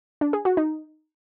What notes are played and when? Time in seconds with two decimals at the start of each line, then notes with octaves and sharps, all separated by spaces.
0.21 D4
0.33 G#4
0.45 F#4
0.57 D#4